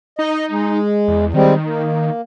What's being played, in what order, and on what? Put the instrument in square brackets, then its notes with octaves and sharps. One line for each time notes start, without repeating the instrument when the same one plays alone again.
[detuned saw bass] D#4 [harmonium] D#5
[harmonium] G#3
[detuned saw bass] E2
[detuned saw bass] D#3 [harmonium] G3 G#3 C4
[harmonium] A#3